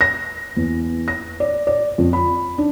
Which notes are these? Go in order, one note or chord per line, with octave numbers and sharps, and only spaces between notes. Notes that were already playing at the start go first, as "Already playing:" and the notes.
A#6
E2
A#6
D5
D5
F2
B5
D4